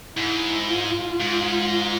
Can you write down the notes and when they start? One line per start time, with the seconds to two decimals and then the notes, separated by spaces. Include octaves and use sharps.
0.17 G#2 E4
0.69 F4
1.20 G#2